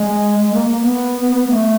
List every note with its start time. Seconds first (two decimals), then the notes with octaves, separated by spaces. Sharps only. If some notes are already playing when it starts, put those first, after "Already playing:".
Already playing: G#3
0.40 G#3
0.54 A#3
0.67 A#3
0.81 B3
1.21 B3
1.35 B3
1.48 A3